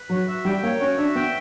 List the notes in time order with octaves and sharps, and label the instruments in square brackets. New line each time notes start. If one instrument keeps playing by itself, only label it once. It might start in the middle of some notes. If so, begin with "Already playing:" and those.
Already playing: [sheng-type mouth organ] B4
[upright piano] F#3 [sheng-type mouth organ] F#4
[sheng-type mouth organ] E5
[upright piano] G3 [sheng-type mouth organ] G5
[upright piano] A#3 [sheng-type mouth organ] C#5
[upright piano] C#4 [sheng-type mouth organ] F#4
[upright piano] D4 [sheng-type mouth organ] E5
[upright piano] B3 [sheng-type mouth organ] G5